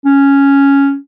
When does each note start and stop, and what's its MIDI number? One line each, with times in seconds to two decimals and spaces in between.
0.05 0.96 61